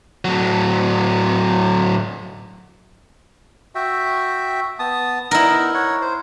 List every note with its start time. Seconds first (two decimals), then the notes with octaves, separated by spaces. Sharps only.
0.25 A2 F#3
3.75 F#4 E5 G5
4.79 B3 A5 D#6
5.31 B3 D#4 E4 A#4
5.74 C#5 F#5
6.01 C5